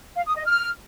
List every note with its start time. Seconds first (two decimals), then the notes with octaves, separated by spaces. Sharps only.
0.16 F5
0.26 D#6
0.36 D#5
0.46 F6